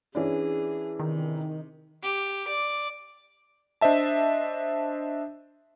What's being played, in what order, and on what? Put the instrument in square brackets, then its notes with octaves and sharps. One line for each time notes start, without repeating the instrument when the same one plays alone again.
[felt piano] E3 C#4 D4 [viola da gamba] G#4
[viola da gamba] C3 [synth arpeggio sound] D#3
[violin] G4
D5
[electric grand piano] D4 C5 D#5 E5 A5